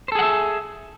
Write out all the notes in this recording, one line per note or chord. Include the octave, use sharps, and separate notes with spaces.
G#4 A4 C5 E5 F#5